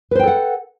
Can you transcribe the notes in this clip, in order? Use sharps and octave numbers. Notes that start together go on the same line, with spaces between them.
A4 B4 C5 F#5 G5